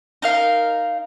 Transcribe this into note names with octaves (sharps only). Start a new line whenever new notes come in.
D#4 A#4 F5